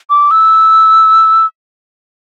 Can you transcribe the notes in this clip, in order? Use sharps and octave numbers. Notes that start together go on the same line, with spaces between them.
D6
E6